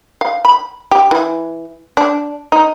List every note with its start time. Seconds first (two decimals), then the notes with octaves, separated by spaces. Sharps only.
0.21 F5
0.45 B5
0.91 G4
1.11 E3
1.97 D4
2.52 D#4